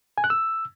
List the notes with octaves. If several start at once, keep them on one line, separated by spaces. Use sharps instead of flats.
G#5
F#6
E6